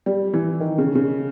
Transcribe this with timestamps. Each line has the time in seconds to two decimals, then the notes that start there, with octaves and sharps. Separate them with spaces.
0.06 G3
0.33 E3
0.60 D#3
0.78 C#3
0.95 C#3